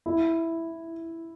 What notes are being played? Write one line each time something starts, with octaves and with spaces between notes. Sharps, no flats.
E4